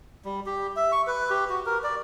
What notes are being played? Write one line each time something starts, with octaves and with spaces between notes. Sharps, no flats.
G3
G4
E5
C#6
B4
G4
F#4
A#4
D5